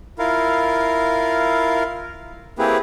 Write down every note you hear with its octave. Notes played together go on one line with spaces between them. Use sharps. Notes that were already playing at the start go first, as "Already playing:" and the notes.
E4 F4 A#4 F5
A#3 C4 E4 G4 G#4 B4